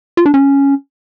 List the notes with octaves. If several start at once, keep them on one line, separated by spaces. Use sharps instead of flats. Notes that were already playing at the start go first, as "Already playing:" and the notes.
F4
D4
C#4